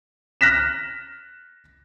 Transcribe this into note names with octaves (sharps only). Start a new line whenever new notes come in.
F6 F#6 A#6 B6 E7